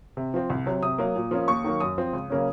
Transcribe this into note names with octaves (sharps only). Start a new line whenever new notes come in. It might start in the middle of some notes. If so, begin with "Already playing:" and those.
C3
F3 C4
C2
C3 F#3
C3 D#6
F#3 A#3
A#2
F3 A#3 C#4
D#2 C#6
D#3 F#3 A#3
F#2 D#6
F3 C4
C#2
C#3 F#3 A#3 C#4